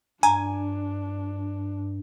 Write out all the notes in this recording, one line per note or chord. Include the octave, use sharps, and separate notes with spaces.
G2 D4 G#5 A#5